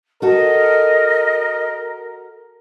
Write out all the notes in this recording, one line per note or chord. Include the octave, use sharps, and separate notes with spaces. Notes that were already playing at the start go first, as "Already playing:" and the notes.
F#4 A4 A#4 D#5